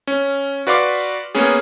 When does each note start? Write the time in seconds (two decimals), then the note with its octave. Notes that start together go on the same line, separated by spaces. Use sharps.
0.07 C#4
0.67 F#4 B4 D5 F5 C6 D6
1.35 A#3 B3 C#4 G#4